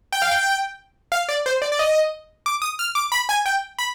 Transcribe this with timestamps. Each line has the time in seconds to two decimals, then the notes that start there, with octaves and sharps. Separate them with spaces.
0.12 G5
0.22 F5
0.31 G5
1.12 F5
1.29 D5
1.46 C5
1.62 D5
1.72 D5
1.79 D#5
2.46 D6
2.62 D#6
2.79 F6
2.95 D6
3.12 B5
3.29 G#5
3.46 G5
3.79 B5